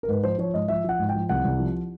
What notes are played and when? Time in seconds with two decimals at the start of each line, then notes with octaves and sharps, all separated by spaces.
0.03 A#4
0.08 G#2 B4
0.24 F3 C5
0.38 F3 C#5
0.54 G#2 D#5
0.68 F3 E5
0.84 F3 F#5
0.99 G#2
1.09 G5
1.15 F3
1.29 C2 F#5
1.45 C2
1.60 F3